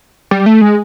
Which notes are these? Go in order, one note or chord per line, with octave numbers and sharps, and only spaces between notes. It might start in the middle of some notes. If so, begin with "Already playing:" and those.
G3
A3
G#3